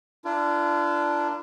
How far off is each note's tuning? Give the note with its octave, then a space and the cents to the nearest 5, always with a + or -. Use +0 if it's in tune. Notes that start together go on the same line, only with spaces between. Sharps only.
D4 +0 F4 -40 A#4 +0